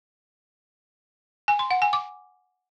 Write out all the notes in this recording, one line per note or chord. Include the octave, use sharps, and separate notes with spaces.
G#5
C6
F#5
G#5
D6